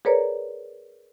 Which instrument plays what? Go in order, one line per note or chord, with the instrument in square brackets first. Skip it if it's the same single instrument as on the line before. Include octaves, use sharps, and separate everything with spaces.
[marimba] G#4 A#4 B4 C#5 D5 A#5